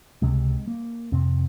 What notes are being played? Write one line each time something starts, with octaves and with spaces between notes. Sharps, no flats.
C#2 C3 G#3
A#3
F2 C3 C4